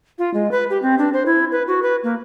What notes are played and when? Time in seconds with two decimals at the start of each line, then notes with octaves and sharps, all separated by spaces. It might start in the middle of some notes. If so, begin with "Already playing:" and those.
0.19 F4
0.34 G#3
0.51 B4
0.70 G4
0.82 C4
0.98 D4
1.13 C5
1.26 E4
1.52 B4
1.67 F#4
1.83 B4
2.03 A#3